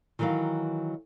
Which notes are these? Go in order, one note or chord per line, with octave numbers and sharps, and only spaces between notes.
D#3 E3 F#3 A#4 F5